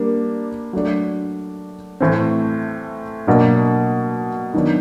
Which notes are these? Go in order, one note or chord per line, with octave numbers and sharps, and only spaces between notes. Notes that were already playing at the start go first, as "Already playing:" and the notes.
Already playing: G3 A#3 D4
F#3 A3 D4
A2 E3 A3 C4
B2 F#3 A#3 D4
D#3 F#3 B3 D4